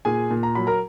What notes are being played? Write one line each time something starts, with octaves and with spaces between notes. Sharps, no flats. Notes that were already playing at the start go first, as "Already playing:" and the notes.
A#2 G#4 G#5
A#2
A#5
F#3 B5
A#4 A#5